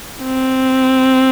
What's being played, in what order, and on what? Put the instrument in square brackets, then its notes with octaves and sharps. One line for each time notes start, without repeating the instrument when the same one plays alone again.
[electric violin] C4